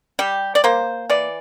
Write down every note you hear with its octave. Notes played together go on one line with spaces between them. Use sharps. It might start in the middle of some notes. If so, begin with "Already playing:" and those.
G3 G4
D5
A#3 C5
E3 D5